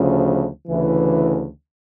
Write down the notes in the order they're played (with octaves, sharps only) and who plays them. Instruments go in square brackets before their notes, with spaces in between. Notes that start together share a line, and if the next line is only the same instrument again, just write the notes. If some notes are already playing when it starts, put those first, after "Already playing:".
Already playing: [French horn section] D2 C#3 F3
D2 C#3 E3